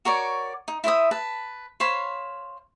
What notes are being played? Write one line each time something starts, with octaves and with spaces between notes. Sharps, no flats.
F#4 A#4 C#5 D5
D#4
E4 C5 E5 D#6
B4 A5
C5 C#5 F5 B5